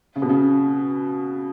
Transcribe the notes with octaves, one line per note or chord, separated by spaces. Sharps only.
C#3
B2
C#3